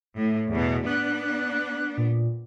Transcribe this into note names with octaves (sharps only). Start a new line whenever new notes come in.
A2
E2 B2
B3 D4 F#6
A#2